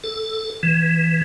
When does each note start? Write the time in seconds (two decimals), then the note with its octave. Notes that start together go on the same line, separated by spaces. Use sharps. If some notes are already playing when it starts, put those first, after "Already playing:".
0.04 A4
0.63 E3